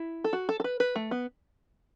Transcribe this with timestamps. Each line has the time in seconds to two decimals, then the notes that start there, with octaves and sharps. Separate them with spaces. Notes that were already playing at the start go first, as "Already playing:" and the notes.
Already playing: E4
0.24 A4
0.33 F#4
0.49 A4
0.60 A4
0.64 B4
0.80 B4
0.96 A3
1.11 B3